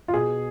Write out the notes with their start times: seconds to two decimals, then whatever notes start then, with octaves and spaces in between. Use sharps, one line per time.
0.08 F4
0.13 B2 G#4